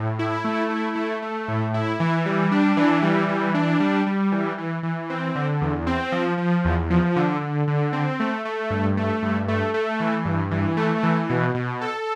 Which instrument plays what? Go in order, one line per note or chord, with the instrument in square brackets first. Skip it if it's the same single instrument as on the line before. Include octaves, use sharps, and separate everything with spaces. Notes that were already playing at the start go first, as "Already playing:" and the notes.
Already playing: [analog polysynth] A2
E4
A3
E4
A3
A3
A2
E4
E3
G3
D4
E3
G3
E3
D4
G3
G3
E3
E3
E3
C4
D3
E2
C4
F3
F3
E2
F3
D3
D3
D3
C4
A3
A3
G2
A3
G2
A3
A3
E3
G2
E3
A3
E3
B2
B2
A4